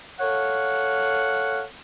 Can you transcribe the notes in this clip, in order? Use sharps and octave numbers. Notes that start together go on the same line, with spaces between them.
A4 C#5 F5 F#5